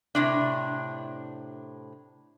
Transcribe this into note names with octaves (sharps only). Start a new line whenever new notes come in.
A2 C3 D4